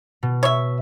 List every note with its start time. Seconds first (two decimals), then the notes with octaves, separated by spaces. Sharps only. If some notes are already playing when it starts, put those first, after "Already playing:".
0.23 B2
0.43 C#5 E5